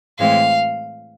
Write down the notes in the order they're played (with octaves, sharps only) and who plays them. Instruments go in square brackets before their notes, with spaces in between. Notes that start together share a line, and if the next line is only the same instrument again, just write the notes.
[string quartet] A2 E3 G#3 C4 F5